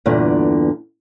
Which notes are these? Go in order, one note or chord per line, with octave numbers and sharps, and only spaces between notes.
E2 G2 A#2 D3